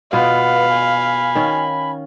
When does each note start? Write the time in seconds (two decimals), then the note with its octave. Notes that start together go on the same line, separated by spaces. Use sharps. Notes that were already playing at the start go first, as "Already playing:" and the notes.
0.13 B2 B3 F4 F5 B5
0.72 G#5
1.35 D#3 C#4